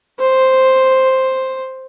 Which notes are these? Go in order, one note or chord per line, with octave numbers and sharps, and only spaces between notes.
C5